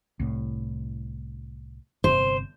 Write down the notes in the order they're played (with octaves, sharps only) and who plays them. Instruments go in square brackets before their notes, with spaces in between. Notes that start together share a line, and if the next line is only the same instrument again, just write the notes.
[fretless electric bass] C2 A2
[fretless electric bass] G1 C3 [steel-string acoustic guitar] C5